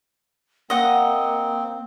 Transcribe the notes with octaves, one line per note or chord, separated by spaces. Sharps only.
A#3 C4 D#5 F#5